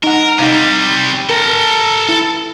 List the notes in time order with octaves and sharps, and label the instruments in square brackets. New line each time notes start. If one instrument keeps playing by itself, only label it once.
[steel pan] D#4 F#5 [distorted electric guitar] A#4
[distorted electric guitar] C3 G3 [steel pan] D#4 F5 A#5
[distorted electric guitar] A4 A#5 [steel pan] A#4
[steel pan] E4